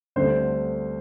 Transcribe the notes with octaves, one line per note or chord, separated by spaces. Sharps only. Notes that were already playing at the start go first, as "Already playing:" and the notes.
D2 D3 G3 C4 C5